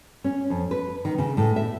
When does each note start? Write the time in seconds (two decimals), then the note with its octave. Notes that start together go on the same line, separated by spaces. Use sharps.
0.24 C#4
0.50 F2
0.71 B4
1.05 D#3
1.18 C#3
1.37 A2
1.56 E5